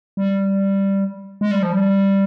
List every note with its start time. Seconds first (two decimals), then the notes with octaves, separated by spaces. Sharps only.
0.17 G3
1.41 G#3
1.51 G3
1.63 F3
1.73 G3